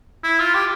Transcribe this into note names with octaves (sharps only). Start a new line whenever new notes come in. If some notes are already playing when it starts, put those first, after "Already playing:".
E4
F4
G4